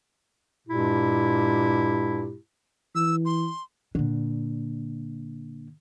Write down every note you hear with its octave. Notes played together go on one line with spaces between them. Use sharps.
G2 A#2 G#3 E4 G4
E3 E6
C6
A#2 D3